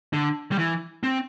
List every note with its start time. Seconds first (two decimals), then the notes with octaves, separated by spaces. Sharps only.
0.13 D3
0.52 G3
0.59 E3
1.03 C4